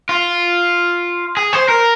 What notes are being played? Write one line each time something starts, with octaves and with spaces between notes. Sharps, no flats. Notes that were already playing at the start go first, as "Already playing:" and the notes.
F4
G#4
C5
A#4